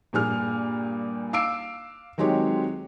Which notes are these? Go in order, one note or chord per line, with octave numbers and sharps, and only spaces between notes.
G2 A#2 G#4 F6
F5 D6 E6 C7 D7
D#3 F#3 G#3 C4 G4 C#5